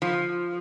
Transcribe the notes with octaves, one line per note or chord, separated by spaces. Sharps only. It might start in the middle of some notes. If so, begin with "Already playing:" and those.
F3